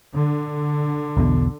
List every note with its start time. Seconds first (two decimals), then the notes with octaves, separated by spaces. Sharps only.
0.11 D3
1.17 B1 E2 B2